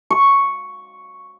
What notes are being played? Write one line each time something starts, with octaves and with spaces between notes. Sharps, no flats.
C#6